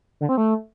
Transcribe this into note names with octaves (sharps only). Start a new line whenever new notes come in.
D3
C4
A3